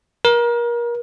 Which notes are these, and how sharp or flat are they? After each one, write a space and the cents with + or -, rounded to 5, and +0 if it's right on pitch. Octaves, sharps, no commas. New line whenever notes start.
A#4 +30